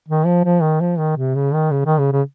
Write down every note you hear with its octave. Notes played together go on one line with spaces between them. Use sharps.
D#3
F3
F3
D#3
F3
D#3
C3
C#3
D#3
C#3
D#3
C#3
C#3